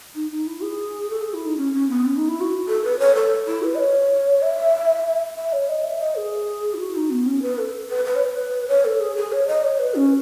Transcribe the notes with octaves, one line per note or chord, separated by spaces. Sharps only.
D#4
D#4
E4
G#4
A4
G#4
E4
D#4
C#4
C#4
B3
C#4
D#4
E4
F#4
A4
B4
C#5
A4
E4
B4
D#5
C#5
E5
E5
C#5
D#5
E5
D#5
G#4
E4
F#4
D#4
B3
C#4
B4
A4
B4
B4
C#5
B4
C#5
A4
G#4
G#4
C#5
D#5
C#5
B4
C#4